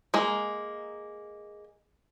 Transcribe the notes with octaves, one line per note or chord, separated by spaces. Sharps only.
G#3 A#3